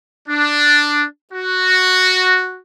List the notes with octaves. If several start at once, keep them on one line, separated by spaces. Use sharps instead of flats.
D4
F#4